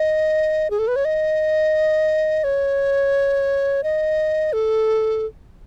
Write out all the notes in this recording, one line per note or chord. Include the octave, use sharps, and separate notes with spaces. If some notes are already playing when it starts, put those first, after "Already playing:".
Already playing: D#5
G#4
A4
B4
C#5
D#5
C#5
D#5
A4